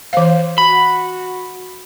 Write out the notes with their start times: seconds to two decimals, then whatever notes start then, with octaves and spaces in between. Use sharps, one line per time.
0.13 E3 C5 F5
0.58 F#4 B5